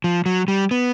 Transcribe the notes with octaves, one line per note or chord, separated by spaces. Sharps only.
F3
F#3
G3
B3